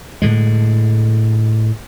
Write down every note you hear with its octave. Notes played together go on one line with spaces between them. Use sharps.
A2 D3 G#3